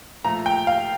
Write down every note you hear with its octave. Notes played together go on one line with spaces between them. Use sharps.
A#2 F3 A3 A#5
G5
F5